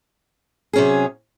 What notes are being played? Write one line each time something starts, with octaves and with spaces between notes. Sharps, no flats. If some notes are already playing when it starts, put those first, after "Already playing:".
C3 F#3 C#4 G#4